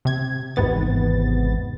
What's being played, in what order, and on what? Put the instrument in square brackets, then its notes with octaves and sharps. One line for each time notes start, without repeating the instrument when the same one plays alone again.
[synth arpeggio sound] C3 G#6
G#1 E2 G#2 C3 B3 A6